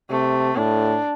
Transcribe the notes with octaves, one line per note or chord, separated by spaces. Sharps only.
C3 A3
A2 D4